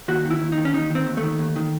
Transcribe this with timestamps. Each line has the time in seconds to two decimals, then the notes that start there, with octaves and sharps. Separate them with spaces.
0.08 D#2 F#4
0.25 D#3
0.31 E4
0.42 D#2
0.52 D#4
0.58 D#3
0.65 C#4
0.74 D#2 D#4
0.90 D#3 C4
1.07 D#2
1.17 A3
1.23 D#3
1.39 D#2
1.56 D#3